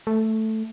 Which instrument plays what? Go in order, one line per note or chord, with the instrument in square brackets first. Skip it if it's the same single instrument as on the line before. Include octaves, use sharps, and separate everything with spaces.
[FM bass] A3